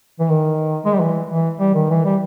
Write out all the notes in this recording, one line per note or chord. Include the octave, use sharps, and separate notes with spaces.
E3
D#3
G#3
G3
E3
E3
G3
D#3
E3
G3